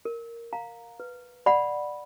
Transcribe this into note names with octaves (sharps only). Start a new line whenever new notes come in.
A#4
F5 A#5
B4
D5 F#5 B5